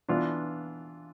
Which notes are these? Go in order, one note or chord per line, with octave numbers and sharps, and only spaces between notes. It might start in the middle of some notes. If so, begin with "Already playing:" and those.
E3 B3 D4 F4